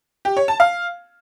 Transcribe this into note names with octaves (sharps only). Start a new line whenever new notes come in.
G4
C#5
A5
F5